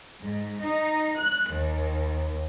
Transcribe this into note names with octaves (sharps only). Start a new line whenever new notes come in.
G#2
D#4
F#6
D#2